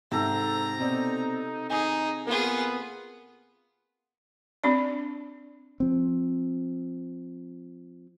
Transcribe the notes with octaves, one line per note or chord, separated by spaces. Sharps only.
G#2 C3 A4 A#5
B2 C4 D#4 D5
D#4 G#4 G#5 D#6
A#3 B3 F4 G#4
C4 D4 D5
F3 C4